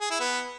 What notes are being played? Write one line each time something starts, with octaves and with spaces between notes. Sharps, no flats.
G#4
E4
B3